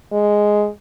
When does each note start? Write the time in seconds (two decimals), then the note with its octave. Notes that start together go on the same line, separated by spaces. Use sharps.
0.12 G#3